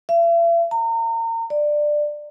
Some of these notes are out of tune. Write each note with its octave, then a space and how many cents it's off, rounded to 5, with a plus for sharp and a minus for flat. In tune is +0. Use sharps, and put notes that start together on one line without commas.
E5 +45
A#5 -35
D5 +15